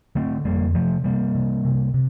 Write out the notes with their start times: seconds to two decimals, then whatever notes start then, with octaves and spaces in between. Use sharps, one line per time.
0.15 D3 A3 C4
0.44 F2 G3 A#3
0.74 C3 F3 A3
1.04 C3 G3 A#3
1.35 C3
1.65 C3
1.94 C3